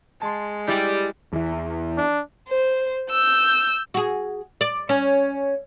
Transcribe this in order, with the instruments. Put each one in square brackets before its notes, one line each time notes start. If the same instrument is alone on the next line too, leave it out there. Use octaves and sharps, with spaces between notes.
[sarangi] G#3 [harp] A5 C6
[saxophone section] G3 [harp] E4
[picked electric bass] E2 E3
[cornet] D4
[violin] C5
E6 G6
[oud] F#4 G#4
D5
C#4